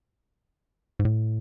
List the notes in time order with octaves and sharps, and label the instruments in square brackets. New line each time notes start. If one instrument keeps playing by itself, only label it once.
[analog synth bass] G#2
A2